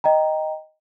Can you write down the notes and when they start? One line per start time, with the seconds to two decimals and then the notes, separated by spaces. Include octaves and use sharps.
0.04 D#5 G5 A#5